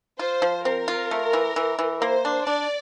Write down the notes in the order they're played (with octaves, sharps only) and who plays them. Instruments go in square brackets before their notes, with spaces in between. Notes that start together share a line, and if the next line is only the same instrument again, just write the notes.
[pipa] F4 [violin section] C5
[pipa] F3
[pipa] C4 [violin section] A#4
[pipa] F4
A3
E3
E3
E3
[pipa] A#3 [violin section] C5
[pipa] D4
[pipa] D4 [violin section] D5